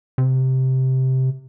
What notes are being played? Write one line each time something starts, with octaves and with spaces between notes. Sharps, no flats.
C3